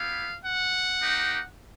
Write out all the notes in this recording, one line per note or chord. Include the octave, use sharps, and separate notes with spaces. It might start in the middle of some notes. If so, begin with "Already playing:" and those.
Already playing: B3 E4 G4 F5
F#5
A#3 D#4 G4